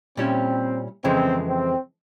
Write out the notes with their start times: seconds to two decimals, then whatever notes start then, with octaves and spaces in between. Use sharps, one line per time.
0.17 A#2 G3 C4 C#4 E4
1.04 F2 C#3 E3 G#3 C4
1.48 C4